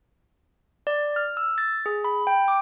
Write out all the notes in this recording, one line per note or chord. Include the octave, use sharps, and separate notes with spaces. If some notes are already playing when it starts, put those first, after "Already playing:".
D5
F6
E6
A6
G#4
B5
G5
D6